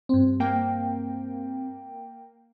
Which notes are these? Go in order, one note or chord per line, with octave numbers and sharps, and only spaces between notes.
G2 C4
A#3 G5